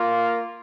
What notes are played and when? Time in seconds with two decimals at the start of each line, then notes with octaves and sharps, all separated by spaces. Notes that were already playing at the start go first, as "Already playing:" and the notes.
Already playing: A#3 F4